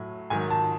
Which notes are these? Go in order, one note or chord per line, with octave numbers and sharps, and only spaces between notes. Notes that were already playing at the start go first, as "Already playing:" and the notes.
Already playing: A2 F#3
G#2 D#3 F#3 G#5
A5